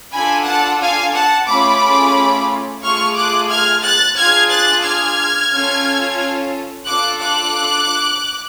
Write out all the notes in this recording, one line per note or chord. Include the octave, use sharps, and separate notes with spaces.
D4 F4 A4 G#5 B5
F#5 A5
F5 G#5
F#5 A5
A3 C#4 F4 G#4 B5 D6
A3 F4 G#4 C#6 F6
D6 F#6
F6 G#6
F#6 A6
D4 F4 G#4 F6 G#6
F#6 A6
F6 G#6
C#4 F4 A4
D4 F4 A4 D6 F#6
D6 F#6